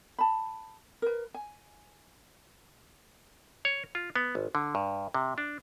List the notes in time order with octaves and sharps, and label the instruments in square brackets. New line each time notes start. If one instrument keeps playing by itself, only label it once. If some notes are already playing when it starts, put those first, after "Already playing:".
[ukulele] A5 B5
A#4 B4
G#5
[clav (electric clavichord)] C#5
F4
B3
G#1
D3
G2
C3
D4